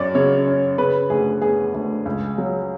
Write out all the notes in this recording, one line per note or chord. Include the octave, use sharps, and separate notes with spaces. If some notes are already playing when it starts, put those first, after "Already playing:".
Already playing: F#2 C#4 D5
C#3 C#5
C#4
C#3 B4
D2 G#4
B3 G#4
D2
C#2
F#3